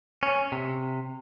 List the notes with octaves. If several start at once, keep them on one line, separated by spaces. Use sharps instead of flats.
C#4
C3